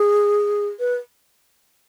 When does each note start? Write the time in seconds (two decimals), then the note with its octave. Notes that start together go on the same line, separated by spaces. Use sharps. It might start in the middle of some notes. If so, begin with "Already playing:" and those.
Already playing: G#4
0.80 B4